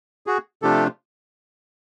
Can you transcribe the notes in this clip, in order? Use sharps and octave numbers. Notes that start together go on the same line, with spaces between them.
F#4 G#4
C3 F3 A3 D4 F4 G4 A4